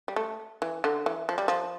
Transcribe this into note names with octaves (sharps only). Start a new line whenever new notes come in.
G3
A3
E3
D3
E3
F3
G3
F3